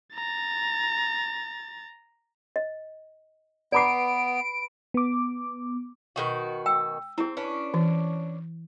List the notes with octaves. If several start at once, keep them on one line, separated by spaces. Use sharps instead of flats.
A#5 A6
D#5
B3 B4 D5 A#5 B5 D6 C7 D7
B3 D6
B2 D#3 F#4
G5 E6
C4 E4 G#4
C#4 D4 B4
E3